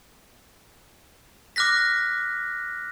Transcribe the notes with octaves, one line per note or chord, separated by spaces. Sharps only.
D6 F6 F#6 A#6 B6